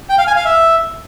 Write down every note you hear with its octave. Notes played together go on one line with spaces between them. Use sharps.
G5
F5
G#5
F5
E5